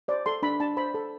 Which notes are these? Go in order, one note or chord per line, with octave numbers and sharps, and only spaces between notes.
C5 D5
A4 C6
D4 B5
D4 A5
C5 B5
A4